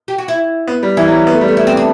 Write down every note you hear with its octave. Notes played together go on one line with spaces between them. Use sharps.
G4
F#4
E4
B3
G3
E3 E4
F#3
G3
B3
A3
G3
A3
E4
C4
D4